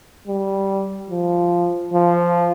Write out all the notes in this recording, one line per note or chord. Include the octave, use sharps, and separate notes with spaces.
G3
F3
F3